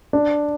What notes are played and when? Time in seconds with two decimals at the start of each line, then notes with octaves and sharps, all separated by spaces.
0.13 D4